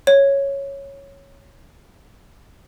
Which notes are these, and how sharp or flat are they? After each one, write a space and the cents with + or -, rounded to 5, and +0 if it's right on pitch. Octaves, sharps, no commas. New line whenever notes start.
C#5 +0